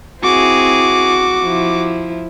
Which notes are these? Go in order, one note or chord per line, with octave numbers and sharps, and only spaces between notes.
C4 E4 F#4 G#4 D6
F3 E4